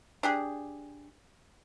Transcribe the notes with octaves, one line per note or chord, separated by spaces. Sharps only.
D4 G4 G#4